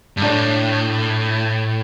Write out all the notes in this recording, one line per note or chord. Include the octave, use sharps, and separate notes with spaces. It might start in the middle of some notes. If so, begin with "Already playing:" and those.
G2
A2 D4